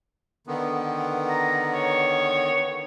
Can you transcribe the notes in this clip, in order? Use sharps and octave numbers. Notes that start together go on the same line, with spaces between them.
D3 D#3 B3
A#5
C#5